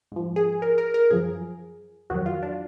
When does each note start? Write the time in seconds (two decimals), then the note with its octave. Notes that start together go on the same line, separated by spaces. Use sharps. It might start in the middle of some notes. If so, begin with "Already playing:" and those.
0.12 G#2 F3
0.36 G#4
0.62 A#4
0.78 A#4
0.94 A#4
1.10 F#2 F3 G#4
2.10 F2 D#3 F#3 F#4
2.26 F4
2.43 D4